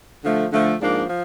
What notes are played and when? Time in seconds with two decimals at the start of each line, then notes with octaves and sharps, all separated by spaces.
0.24 D3 F3 A3
0.52 D3 F3 A3
0.80 G#2 F3 A#3 D4
1.09 F3